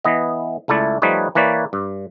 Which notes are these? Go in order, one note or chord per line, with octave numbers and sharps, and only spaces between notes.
E3 B3 D#5
C#2 A3 E4 D5
F3 G3 A3 D#4 B4 C#5
E3 A#3 B4 C#5 D5
G2